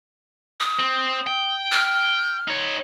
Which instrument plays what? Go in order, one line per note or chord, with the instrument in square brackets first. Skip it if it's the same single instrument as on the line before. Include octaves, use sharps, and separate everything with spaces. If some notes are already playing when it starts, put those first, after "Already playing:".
[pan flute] D#6
[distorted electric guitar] C4
G5
[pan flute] F6
[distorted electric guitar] D#4 C#5